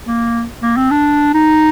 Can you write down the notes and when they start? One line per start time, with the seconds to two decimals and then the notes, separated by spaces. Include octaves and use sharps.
0.06 A#3
0.62 A#3
0.77 C4
0.91 D4
1.34 D#4